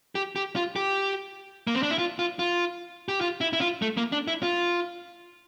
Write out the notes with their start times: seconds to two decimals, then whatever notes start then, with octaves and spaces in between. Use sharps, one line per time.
0.15 G4
0.36 G4
0.56 F4
0.76 G4
1.67 A#3
1.75 C4
1.83 D4
1.91 E4
1.98 F4
2.19 F4
2.39 F4
3.08 G4
3.21 F4
3.41 E4
3.53 E4
3.61 F4
3.82 A3
3.97 A#3
4.12 D4
4.28 E4
4.43 F4